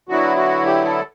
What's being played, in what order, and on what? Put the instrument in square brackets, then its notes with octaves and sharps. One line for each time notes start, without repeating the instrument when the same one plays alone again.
[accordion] D3 F#3 B3 E4 F#4
F#4
G4
A4